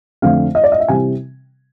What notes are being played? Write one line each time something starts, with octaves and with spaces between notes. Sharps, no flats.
F2 D3 F3 A3 C4 F5
D#5
D5
D#5
E5
C3 E3 G3 C4 G#5